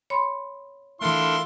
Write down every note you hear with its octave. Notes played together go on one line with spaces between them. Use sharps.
C#5 B5 C6
E3 A3 D4 E4 F4 A4 A#4 C6